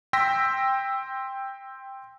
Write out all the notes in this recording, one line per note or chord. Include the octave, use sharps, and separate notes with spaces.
G5 C6 E6 A#6 B6